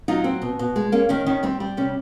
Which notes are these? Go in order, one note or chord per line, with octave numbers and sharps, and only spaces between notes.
F#3 D#4 F4
C4
B2
B2
G#3
A#3 C#4
D#3 C#4 D#4
D#3 C#4
G3 C4
G3
C3 C#4